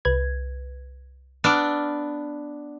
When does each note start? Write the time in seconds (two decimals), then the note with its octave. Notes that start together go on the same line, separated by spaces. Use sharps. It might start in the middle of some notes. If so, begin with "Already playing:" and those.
0.05 C2 B4 G#6
1.44 B3 D4 D6 E6 F6